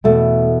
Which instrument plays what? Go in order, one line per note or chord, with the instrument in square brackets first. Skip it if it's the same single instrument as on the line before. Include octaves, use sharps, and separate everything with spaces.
[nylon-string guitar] E2 B2 A3